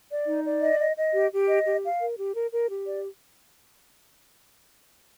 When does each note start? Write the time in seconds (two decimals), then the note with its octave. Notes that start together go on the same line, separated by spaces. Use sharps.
0.11 D5
0.28 D#4
0.45 D5
0.62 D#5
0.80 D#5
0.97 D#5
1.14 G4
1.32 G4
1.49 D#5
1.66 G4
1.83 F5
2.00 A#4
2.18 G4
2.35 A#4
2.52 A#4
2.69 G4
2.87 D5